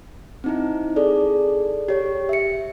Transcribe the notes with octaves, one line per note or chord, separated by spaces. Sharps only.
C4 D#4 E4
G#4 A4 D5
G4 C#5
E5 C#7